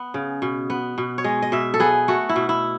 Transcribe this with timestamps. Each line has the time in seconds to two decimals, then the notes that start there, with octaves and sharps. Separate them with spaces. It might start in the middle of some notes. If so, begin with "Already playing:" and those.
Already playing: B3
0.14 C#3
0.42 B2
0.70 B3
0.98 B2
1.18 C#5
1.24 G#3 D#5
1.42 D#5
1.52 B2 E5
1.74 A4
1.80 B3 G#4
2.08 A3 F#4
2.29 E4
2.36 B2
2.49 E4